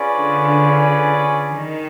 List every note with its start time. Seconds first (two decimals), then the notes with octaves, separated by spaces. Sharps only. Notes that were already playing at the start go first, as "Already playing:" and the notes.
Already playing: C#4 F4 G#4 B4 D5
0.16 D3
1.52 D#3